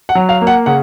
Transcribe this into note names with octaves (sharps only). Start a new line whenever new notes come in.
F#5
F#3
F5
A#3
F#5
C#3 F#5